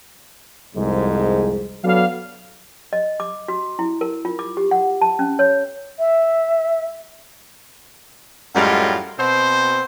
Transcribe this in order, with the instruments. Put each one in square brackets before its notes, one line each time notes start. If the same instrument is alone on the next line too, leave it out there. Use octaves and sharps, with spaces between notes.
[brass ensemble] C2 F2 G#2 G#3
F#3 B3 D4 A4 F5
[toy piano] D#5
D6
F#4
E4
A#4
F4
D6
G4
F#5
A5
C#4
C#5
[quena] E5
[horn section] F#2 A2 G3 G#3 F4 A#4
B2 C4 C5